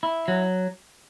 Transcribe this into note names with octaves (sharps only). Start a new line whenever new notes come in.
E4
F#3